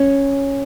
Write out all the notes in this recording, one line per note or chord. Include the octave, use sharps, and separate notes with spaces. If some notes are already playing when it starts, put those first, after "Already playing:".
Already playing: C#4